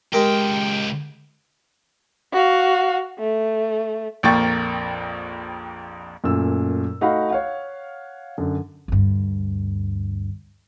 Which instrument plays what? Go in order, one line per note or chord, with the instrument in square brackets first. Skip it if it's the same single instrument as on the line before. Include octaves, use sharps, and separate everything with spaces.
[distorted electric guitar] C#2 G5 [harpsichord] G#3 G4 A#4
[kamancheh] F#4 F5
A3
[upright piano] A#1 F2 A#3 G5 C#6 A6
[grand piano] F#2 A#2 A3 E6
A3 D#4 F#4 F5 F#5 B5
C#5 F5 F#5
F#2 D3
[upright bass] D2 G2